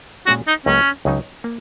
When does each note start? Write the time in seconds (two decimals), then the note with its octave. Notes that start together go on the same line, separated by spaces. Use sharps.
0.27 A#2 G#3 C#4 F#4
0.47 D#4
0.66 C#2 C#3 F#3 A#3 C#4
1.05 C#2 C#3 F#3 D#4
1.44 A#3